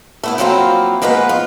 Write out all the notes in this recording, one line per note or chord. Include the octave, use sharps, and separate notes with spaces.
A3 B3 E4
F3 F#3 A#3 C4 E4 F4
F3 G#3 A#3 B3 B4
F4